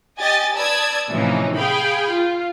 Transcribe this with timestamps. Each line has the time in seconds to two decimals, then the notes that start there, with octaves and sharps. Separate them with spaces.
0.19 G4 D#5 G#5 A6
0.56 B4 D5 A5 D#6 E6 G#6
1.09 A2 C3 E3 F3 C#4 D#4
1.56 G#4 F5 G5 B5
2.10 F4